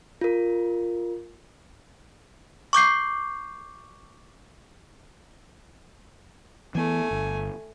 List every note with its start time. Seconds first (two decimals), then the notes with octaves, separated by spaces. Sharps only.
0.21 F4 A#4
2.73 C#6 D6 G6 C7
6.75 E3 A3 B3 G#5
7.11 G1